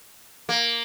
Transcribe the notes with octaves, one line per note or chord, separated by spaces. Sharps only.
A#3